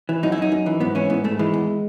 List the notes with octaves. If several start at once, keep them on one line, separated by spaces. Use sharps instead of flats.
E3
F#2 D#4
E4
F#2 D#4
F#2
E3
G#2 B3
E3 C#4
G#2 B3
G#2 A3
E3 G#3
E2